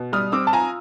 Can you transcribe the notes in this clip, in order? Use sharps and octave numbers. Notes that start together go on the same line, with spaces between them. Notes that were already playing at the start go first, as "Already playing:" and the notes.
Already playing: B2
G3 D#6 F6
C4 D6 E6
A5
F4 G#5 A#5